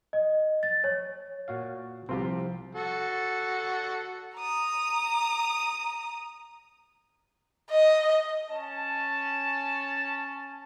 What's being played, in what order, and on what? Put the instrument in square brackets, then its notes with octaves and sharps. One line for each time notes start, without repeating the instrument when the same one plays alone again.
[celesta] D#5
A6
C#5
[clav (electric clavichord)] A#2 F#4 F5
[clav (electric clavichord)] C2 [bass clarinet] F3 [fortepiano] C4 F4 G4
[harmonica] F#4 A4
[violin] A#5 D#6
[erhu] D#5
[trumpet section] C#4 A5